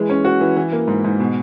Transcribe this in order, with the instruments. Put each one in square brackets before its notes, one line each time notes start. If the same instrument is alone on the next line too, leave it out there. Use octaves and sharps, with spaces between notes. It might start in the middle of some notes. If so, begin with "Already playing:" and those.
Already playing: [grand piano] E3 G#3
C#4
F#4
E3
E3
A#3
G#2
G#2
B2